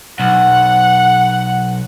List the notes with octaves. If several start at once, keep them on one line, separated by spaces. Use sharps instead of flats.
B1 F#5